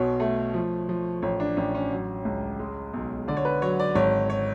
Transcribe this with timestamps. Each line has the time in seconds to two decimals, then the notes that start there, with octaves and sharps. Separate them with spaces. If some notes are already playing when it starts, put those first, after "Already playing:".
Already playing: B1 B2 C#5
0.20 A3
0.54 F3
0.89 F3
1.22 A1 C#5
1.40 D4
1.57 A1 C#4
1.75 C#4
1.91 F#3
2.25 C#2
2.59 G#3
2.94 B1
3.28 D3 D5
3.37 C#5
3.45 B4
3.62 F#3 C#5
3.80 D5
3.95 G#1 C#5
4.30 C#5